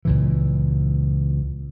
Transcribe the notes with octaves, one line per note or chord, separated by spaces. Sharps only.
C#2 A#2 E3